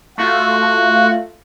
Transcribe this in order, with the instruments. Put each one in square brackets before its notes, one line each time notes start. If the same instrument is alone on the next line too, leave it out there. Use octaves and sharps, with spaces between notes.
[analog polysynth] A3 F4 [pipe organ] F#4